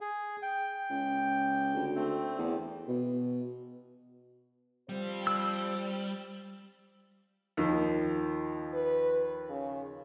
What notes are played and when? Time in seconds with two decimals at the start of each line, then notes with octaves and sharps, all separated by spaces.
0.01 G#4
0.42 G5
0.90 C#2
1.75 D2
1.95 A3 C4
2.39 E2
2.88 B2
4.89 F3 G3 C4 C5
5.27 E6
7.57 D#2 D#3 F3
8.73 B4
9.50 C#3